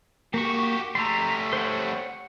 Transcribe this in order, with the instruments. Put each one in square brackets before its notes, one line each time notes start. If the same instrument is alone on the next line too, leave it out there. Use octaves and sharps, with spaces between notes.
[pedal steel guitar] A#3 C#6 [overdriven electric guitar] F#4 G4
[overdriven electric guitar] G3 A3 [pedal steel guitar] A#5 C6
[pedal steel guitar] C5 C#5 F#5